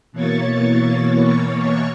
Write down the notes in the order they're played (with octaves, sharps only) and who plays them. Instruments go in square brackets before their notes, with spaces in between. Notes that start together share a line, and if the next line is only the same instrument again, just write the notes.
[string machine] B2 E3 A#3 C#5 C#6 A6